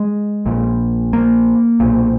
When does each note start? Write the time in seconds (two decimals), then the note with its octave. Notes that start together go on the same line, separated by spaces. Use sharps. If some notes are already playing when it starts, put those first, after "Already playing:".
Already playing: G#3
0.46 A#1 A#2
1.13 A#3
1.80 B1 A#2